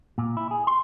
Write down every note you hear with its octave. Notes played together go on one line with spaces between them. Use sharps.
A#2
E4
G#4
C6